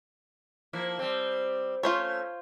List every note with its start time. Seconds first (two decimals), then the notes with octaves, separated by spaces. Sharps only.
0.73 F3 A#3 E4
0.99 G3 C4
1.83 A3 C#4 F4 C5 C#5